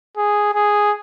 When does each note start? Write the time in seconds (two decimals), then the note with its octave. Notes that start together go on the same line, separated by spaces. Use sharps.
0.17 G#4
0.54 G#4